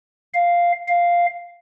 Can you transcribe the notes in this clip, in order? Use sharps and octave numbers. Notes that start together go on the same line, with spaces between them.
F5
F5